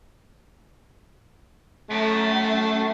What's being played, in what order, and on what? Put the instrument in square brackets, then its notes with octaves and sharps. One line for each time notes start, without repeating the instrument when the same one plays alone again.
[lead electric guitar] F#2 [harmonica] A3